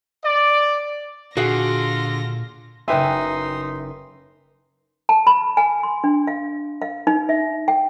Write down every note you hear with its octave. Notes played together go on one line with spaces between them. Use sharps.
D5
A#2 D3 F4 F#4 G#4 F5 A#6
F#1 D#4 B4 E5 G5 G#5 C6
A5
B5
G#5
C6
D4
F5
F5
D#4
E5
G5